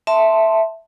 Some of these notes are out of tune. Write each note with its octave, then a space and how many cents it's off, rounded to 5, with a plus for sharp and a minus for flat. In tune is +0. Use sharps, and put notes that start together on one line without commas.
E5 +0 A5 +5 C6 +0